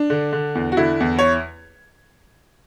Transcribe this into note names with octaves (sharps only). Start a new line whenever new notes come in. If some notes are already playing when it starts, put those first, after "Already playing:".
Already playing: D4
D3
D3
E2
F#4
D3 E4
E2
C#5